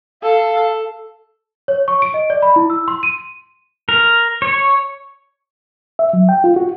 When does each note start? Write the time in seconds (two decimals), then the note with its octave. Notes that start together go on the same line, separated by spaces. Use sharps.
0.23 A4 F5
1.68 C#5
1.88 C#6
2.02 D7
2.14 D#5
2.30 D5
2.42 B5
2.56 E4
2.70 E6
2.88 C6
3.03 D#7
3.89 A#4
4.42 C#5
5.99 E5
6.13 F#3
6.29 G5
6.44 F4
6.56 F#4